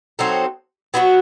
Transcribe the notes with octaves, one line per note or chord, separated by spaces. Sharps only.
F#3 C4 D#4 A4
F#3 B3 D#4 F#4